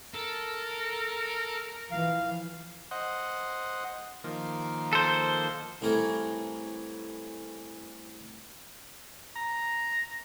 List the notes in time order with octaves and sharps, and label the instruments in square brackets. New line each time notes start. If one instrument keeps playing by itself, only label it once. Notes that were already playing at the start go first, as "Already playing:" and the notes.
[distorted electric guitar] A4 [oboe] A#4
[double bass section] E3 F3 [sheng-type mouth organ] F5
[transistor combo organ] C5 D#5 F#5
D#3 F3 A#3
[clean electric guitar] A4 C5
[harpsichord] C2 A2 E3 A3 A#4 G#5
[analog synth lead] A#5